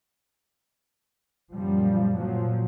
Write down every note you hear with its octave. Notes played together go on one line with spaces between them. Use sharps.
F#2 A#2 F3 G3
A#2 F3 F#3